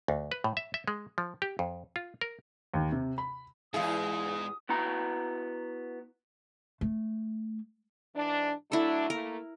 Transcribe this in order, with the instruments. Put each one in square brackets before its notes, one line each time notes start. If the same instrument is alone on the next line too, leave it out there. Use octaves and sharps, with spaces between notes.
[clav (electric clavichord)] D2
B4
A2
E5
E5
G#3
F3
G4
F2
F4
A#4
[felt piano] D#2
C3
B5
[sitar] E2 G#4 [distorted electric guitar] G#2 [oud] E4 F4 [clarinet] D#6
[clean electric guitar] B3 E4 F#4 A#5
[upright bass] A3
[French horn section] G#2 E3 D4
[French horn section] F#3 A3 D4 [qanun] E4 A4
[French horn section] A3 A#3 [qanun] A#4